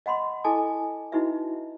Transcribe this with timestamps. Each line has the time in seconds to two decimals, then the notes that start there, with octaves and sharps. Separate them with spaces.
0.06 D#5 F#5 B5 C6
0.44 E4 A4 D#5 G#5 A5 D6
1.12 D#4 E4 F#4 B4 D#5 E5